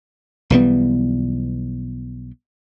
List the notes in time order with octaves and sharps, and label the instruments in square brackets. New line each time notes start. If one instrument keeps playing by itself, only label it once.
[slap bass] B1 E3 G3 B3